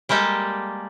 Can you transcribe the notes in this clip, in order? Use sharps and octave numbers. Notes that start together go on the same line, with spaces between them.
G3 G#3 A#3 G4 A4